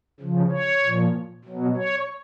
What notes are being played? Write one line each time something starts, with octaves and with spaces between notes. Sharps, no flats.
C#3 F3
C#5
A#2 F3
B2 F#3
C#5